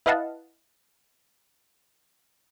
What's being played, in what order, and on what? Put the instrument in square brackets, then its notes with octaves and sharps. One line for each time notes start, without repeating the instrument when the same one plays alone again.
[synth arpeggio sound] E4 B4 D#5 F5 F#5 A5